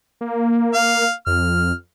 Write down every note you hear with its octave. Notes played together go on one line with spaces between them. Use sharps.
A#3
F5
F2 F6